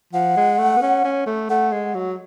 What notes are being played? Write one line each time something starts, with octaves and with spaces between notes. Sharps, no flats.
F3 F#5
G#3
A3
B3
C#4
C#4
A3
A3 F#5
G#3
F#3